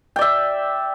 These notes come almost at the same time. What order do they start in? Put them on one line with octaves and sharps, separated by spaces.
G5 D5 E5